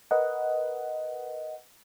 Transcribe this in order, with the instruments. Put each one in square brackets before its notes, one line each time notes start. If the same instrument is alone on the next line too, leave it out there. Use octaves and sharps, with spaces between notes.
[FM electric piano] A#4 B4 D#5 F#5